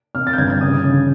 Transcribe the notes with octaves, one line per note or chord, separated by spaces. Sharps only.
C3 F6
A6
G6
G1 G#6
G#6
C#3 D#6
C#3